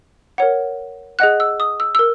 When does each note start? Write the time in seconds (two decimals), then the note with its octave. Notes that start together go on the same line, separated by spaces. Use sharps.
0.38 A#4 C#5 F#5
1.19 G#4 D#5 F#5 F#6
1.40 E6
1.60 D#6
1.80 E6
1.95 E6
1.99 A#4